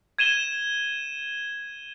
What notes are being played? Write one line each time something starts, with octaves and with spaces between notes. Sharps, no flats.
G#6 D#7 E7 G7